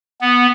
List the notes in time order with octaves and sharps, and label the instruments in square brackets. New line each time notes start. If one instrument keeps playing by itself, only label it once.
[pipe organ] B3